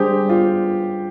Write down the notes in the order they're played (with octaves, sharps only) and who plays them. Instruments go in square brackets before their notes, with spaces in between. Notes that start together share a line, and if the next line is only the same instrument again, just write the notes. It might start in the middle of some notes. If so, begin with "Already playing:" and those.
Already playing: [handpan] G3 D4 G#4 C5 [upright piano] G4
[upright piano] F4